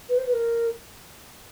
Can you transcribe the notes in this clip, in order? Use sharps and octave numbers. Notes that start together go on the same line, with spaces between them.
B4
C5
B4
A#4